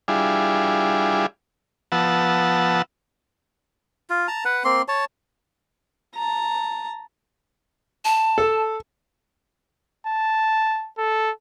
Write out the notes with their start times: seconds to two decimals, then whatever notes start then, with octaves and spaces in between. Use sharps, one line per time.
0.08 G3 D4 E4 F4 G#4
1.92 F3 B3 F#5 A5 E6
4.10 F4
4.28 A5 A#5
4.45 B4 F#5
4.64 A#3 C4 C6
4.88 C#5 A5
6.15 A5 A#5
8.05 A5
8.38 A4
10.07 A5
10.98 A4